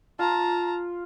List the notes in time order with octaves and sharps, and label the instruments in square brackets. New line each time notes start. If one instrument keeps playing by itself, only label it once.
[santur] F4 [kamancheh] A5 A#5